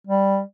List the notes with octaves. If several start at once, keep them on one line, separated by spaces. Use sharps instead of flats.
G3